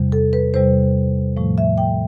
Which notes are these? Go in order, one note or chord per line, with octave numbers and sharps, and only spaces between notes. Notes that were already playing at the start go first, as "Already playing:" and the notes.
Already playing: E2 C3 G3
A4
B4
E2 C3 G3 C5
A2 F3 A3
E5
G5